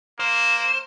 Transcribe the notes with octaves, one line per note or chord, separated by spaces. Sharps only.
A#3 C5